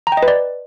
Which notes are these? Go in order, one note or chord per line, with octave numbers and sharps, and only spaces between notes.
A#5
G5
D#5
B4
D5